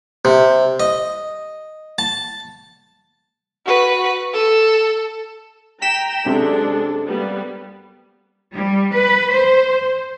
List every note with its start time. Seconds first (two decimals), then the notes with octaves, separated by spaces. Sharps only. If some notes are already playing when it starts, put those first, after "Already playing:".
0.25 C3
0.80 D#5
1.99 A5
3.66 F#4 B4
4.34 A4
5.82 G5 A#5 B6 E7
6.26 F#2 C3 G#3 D4 A4
7.07 G3 A#3 B3
8.53 G3
8.93 B4
9.32 C5